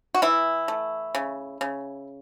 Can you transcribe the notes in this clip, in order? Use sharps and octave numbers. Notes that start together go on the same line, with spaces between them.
F#4
E3 E4
A3
C#3
C#3